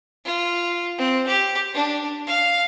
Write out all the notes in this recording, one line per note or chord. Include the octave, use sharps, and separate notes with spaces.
F4
C4
G4
D4
F5